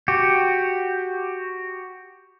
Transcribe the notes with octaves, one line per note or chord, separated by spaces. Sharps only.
F#4 G4